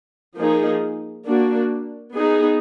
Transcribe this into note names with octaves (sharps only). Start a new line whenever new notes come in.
F3 A#3 D#4 G#4
A#3 D4 F#4
B3 D#4 G#4